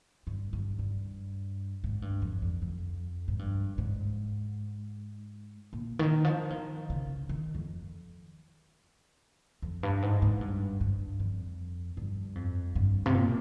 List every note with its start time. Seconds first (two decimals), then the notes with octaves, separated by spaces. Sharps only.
0.27 G2
0.53 G2
0.79 G2
1.84 G#2
2.02 G2
2.22 F2
2.42 F2
2.62 F2
3.28 G#2
3.39 G2
3.78 G#2
5.73 A#2
5.99 D#3
6.25 F3
6.50 D#3
6.90 C#3
7.29 D#3
7.54 F2
9.62 F2
9.83 G2
10.02 G#2
10.22 G#2
10.41 G2
10.81 G2
11.19 F2
11.97 G2
12.35 F2
12.75 G2
13.06 C3
13.14 A#2